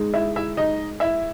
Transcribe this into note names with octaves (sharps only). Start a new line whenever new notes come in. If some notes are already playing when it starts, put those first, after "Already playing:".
Already playing: G#3 D#4 G#4
E4 E5
E4 E5
D#4 D#5
E4 E5